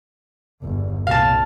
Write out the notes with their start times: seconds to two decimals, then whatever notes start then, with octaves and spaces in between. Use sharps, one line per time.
0.62 G1 E2
1.07 C2 A#2 F5 A5